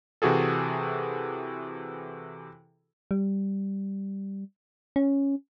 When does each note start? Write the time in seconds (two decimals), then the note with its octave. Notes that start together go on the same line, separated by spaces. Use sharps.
0.22 C3 E3 F#4 G#4 A4
3.11 G3
4.96 C#4